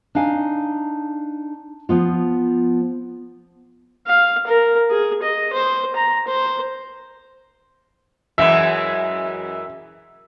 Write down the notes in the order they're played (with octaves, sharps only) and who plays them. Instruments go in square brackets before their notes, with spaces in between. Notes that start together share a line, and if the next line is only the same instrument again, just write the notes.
[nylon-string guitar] D4 D#4 F5 G#5
F3 B3 F4
[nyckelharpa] F5
A#4
G#4
D#5
C5
A#5
C5
[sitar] F#2 E3 G#3 [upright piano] E5